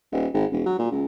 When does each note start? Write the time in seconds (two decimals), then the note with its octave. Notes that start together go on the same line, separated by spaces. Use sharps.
0.12 D#1
0.33 G#1
0.52 E1
0.66 F#3
0.79 A#2
0.91 C#2